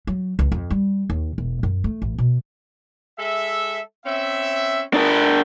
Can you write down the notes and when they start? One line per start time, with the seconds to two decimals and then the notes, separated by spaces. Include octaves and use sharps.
0.07 F#3
0.39 C#2
0.52 F2
0.70 G3
1.10 D#2
1.38 E1
1.63 F#2
1.84 A3
2.02 A1
2.18 B2
3.19 G#3 A4 E5
4.06 C4 C#4 E5
4.94 A3 B3 D4 A#4